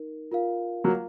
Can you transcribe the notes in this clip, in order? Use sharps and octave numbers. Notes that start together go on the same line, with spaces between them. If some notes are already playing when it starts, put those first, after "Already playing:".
Already playing: D#4 A#4
F4 A#4 F5
F#3 A#3